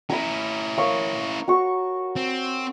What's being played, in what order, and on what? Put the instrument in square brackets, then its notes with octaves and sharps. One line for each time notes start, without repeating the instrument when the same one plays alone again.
[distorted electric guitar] C#4 E4 [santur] A#5 B5
[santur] A#4 C#5 F5
F#4 C#6
[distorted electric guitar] C4